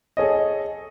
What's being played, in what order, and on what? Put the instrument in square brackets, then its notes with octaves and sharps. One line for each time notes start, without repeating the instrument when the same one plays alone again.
[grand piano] G#4 A4 C#5 D#5